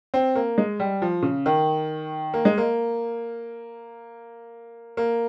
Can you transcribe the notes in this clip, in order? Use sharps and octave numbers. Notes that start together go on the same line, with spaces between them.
C4
A#3
G#3
G3
F3
C#3
D#3
A#3
G#3
A#3
A#3